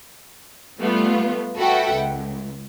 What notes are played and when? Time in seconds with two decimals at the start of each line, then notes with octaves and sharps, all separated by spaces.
0.79 G3 A3 B3 F4
1.57 F#4 A4 B4 E5 F#5 G5
1.94 C#2